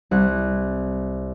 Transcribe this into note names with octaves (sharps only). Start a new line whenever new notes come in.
C2 F#6